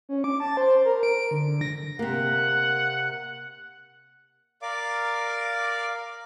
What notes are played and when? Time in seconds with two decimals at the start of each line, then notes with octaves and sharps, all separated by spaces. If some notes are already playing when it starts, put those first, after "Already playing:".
0.09 C#4
0.24 D6
0.40 A5
0.57 C5
0.85 A#4
1.03 D7
1.31 D3
1.61 A#6
1.99 C3 A#3 F#5
4.62 A#4 D5 F5 D6